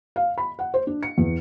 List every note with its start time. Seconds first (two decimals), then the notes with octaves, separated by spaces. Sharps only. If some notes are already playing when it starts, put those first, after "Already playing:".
0.16 F5
0.38 B5
0.59 F#5
0.74 C5
0.87 D4
1.03 C#7
1.18 E2